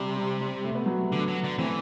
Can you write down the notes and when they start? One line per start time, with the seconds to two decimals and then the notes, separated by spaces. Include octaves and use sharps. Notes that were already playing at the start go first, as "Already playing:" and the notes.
Already playing: C3 G3
0.16 G3
0.41 G3
0.64 A3
0.75 B3
0.85 F#3 A3
1.12 D3
1.28 F#3
1.44 D3
1.59 E3 A3 C4